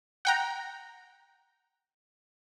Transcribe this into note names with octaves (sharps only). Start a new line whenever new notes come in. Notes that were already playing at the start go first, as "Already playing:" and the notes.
F#5 G5 A#5